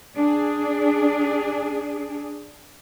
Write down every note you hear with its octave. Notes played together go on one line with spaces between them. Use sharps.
D4 G#4